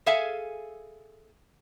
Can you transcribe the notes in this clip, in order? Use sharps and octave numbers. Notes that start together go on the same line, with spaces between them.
G#4 A4 E5 F5 G#5